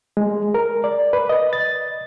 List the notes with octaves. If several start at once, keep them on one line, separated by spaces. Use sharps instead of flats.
G#3
A#4
D5
B4
D#5
A6